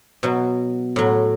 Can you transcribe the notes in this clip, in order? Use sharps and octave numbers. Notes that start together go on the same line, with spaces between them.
B2 F#3
A2 F#3